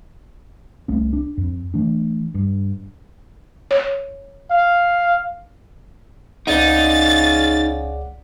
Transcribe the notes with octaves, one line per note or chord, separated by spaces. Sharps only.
C2 A3 C#4
D4
F2
E3 A3 D4
G2
C#5
F5
C#2 C#3 D#4 D5 F#5 A6